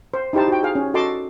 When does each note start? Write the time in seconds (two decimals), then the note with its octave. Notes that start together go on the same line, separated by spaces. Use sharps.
0.14 C5
0.33 D#4 E4 G4 C5 A5
0.48 F#4 G5
0.63 G#4 F5
0.75 C#4
0.94 F#4 A4 D#5 A5 C6 D6